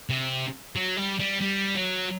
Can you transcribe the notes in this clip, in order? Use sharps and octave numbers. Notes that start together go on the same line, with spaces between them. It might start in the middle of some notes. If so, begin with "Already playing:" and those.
C3
F#3
G3
G3
G3
F#3